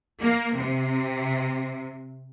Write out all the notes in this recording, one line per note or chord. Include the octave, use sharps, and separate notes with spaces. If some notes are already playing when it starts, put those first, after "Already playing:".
A#3
C3